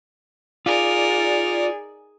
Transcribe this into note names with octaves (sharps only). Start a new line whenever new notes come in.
D#4 F4 G#4 A#4 D5